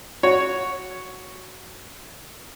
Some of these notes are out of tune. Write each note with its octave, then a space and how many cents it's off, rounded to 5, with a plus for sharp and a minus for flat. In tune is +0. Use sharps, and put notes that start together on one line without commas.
F#4 -5 C#5 +0